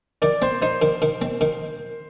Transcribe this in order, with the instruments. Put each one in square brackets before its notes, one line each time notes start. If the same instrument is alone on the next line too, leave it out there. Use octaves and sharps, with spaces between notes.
[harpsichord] D#3 [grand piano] D5
[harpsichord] C4 [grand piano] C5
[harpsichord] D#4 [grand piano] C5
[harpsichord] D#3
D#3
C4
D#3